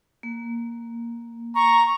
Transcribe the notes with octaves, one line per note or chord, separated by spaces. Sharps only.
A#3
A#5 C#6